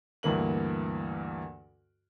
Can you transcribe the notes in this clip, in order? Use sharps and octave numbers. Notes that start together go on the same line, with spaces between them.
D2 G2 E3 A#3 F#7